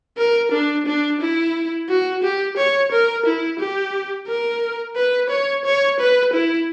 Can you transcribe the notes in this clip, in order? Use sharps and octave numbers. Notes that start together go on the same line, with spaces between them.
A#4
D4
D4
E4
F#4
G4
C#5
A#4
E4
G4
A#4
B4
C#5
C#5
B4
E4